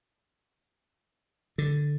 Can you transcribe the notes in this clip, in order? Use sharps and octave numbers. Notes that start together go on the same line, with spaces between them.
D3